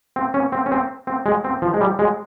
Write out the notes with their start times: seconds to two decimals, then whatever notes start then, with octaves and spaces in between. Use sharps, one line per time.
0.16 C4
0.34 C#4
0.52 C4
0.66 C#4
0.72 C4
1.07 C4
1.26 G#3
1.44 C4
1.62 F3
1.74 G#3
1.81 G3
1.99 G#3